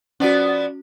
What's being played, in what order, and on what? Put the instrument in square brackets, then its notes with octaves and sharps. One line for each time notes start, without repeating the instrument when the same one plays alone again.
[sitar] F3 B3 D5 [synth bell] C#4 F#4